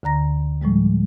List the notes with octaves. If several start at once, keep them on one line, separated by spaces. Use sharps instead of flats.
D2 D3 A#5 A#6
A2 F3 G3 G#3